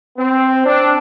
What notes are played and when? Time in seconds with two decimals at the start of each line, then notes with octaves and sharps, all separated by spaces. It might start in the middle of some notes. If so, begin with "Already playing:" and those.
0.16 C4
0.64 D4